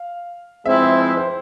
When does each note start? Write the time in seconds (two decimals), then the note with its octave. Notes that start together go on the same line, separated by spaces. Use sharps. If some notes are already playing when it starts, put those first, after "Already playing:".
Already playing: F5
0.65 F3 G#3 C4 E4 E5
0.83 C5
1.01 C5
1.17 C5